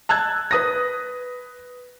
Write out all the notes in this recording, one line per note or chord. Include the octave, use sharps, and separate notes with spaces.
A5 E6 F#6 G#6
B4 D#6 A#6